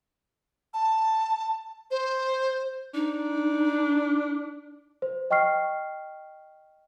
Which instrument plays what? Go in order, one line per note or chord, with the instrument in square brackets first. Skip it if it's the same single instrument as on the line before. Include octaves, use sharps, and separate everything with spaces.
[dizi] A5
C5
[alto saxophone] D4 [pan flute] D#4
[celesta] C5
D#5 G5 C#6 F6 C7